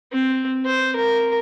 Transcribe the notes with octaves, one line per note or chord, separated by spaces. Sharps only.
C4
C5
A#4